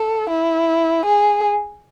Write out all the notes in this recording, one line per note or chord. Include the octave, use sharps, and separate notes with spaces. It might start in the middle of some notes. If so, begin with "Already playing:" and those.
Already playing: A4
E4
G#4